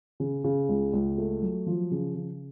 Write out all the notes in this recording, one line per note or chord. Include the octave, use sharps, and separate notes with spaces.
C#3
C#3
C#2
C#2
A3
F#3
F3
C#3
C#3